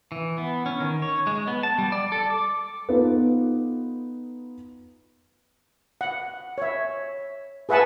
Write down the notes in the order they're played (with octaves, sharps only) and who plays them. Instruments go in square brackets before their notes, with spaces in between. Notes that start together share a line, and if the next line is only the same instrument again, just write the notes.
[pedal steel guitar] E3
B3
C#4
D#3
C#5
G#3
B3
A5
G3
D5
A4
D6
[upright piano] B3 D#4 F4 A4 B4
[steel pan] F#5
C#5 E5
G#4 B4 E5 F#5 G#5 A5